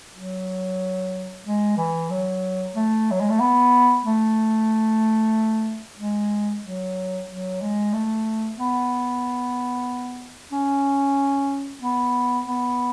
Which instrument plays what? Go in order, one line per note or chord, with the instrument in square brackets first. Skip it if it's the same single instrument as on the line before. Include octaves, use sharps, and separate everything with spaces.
[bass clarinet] F#3
G#3
E3
F#3
A3
F#3
G#3
A3
B3
A3
G#3
F#3
F#3
G#3
A3
B3
C#4
B3
B3